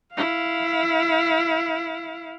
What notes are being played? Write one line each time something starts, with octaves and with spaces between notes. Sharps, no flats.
E4 F5